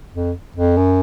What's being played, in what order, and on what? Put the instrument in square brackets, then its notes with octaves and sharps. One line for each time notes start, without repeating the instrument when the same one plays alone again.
[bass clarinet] F2
F2
F#2